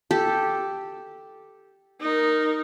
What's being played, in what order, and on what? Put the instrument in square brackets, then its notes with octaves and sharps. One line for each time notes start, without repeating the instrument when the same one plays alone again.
[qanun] G4 A4
[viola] D#4 A#4